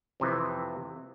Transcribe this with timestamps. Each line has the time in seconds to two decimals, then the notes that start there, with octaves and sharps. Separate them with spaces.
0.20 F2 C3 E3